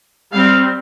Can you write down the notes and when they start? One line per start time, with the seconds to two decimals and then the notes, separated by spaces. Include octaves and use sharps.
0.33 G3 C4 F5